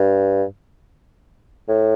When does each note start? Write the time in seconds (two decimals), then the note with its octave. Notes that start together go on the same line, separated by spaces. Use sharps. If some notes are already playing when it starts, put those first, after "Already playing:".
Already playing: G2
1.68 A2